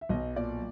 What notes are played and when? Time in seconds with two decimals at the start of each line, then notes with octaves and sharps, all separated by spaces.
0.01 E5
0.09 B1 D#5
0.36 A#2 D5